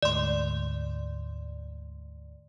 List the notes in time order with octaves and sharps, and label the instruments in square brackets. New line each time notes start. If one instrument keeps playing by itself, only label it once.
[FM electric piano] D2 G#2 [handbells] D5 C6